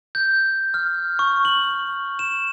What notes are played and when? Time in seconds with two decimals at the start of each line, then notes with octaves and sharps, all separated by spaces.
0.15 G6
0.74 F6
1.19 C#6
1.45 F#7
2.19 E7